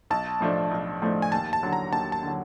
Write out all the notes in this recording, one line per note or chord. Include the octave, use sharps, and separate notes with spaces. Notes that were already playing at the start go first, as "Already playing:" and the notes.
B1 A5
A2 F3 A3 D4
B1
A2 F3 A3 D4
G#5
D#2 A5
A5
D3 F#3
A#5
D#2 A5
A5
D3 F#3